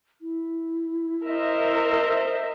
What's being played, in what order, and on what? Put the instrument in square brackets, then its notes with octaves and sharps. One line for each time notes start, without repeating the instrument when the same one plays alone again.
[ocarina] E4
[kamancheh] A#4 D#5 [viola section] C5 E5